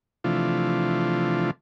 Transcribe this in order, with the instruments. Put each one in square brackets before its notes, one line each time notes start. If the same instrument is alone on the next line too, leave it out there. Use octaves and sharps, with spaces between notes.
[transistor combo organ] C3 E3 F3 A3 D4 F4